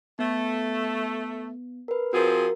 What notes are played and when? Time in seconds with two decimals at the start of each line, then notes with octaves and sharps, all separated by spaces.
0.19 A3 B3
1.88 A#4 B4
2.13 F3 C4 F#4 G#4 A#4